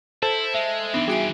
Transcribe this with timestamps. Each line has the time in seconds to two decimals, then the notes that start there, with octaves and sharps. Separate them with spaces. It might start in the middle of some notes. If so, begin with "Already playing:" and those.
0.23 E4 A4 C5 A5
0.54 G#3 E5
0.94 E3 B3 C4 D4 D#4
1.08 G3 F#4 G#4 G#5